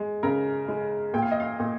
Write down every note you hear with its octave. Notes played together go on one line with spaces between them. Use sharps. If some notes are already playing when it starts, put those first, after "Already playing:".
Already playing: G#3
C#3 A#4
G#3
A#2 G5
F5
D#5
F5
A#2